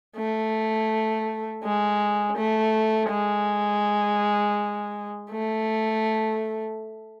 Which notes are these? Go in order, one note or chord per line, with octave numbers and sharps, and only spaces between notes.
A3
G#3
A3
G#3
A3